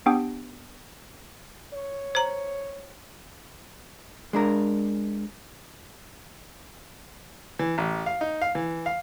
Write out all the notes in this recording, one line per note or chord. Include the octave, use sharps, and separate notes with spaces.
B3 D4 G4 G5 D#6
C#5
C5 A#5
G#3 D4 A#4
E3
A1
F5
D#4
F5
E3
F5